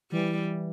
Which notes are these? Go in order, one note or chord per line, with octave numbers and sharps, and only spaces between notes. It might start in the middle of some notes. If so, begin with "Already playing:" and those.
E3 G3